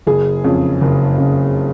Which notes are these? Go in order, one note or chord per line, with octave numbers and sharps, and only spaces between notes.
F#1 G#4
F2 C#3
F#1
C#3